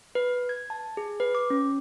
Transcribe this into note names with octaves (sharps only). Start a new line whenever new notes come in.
B4
G#6
A5
G#4
B4
D6
C#4